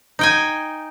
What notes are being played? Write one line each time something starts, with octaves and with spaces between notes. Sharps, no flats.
D#4 G5 G#5